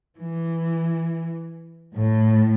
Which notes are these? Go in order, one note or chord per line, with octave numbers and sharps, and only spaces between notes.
E3
A2